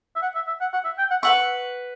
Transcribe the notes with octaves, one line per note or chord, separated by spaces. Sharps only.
E5
F#5
E5
E5
F#5
F#5
E5
G5
F#5
B4 E5 F#5 C#6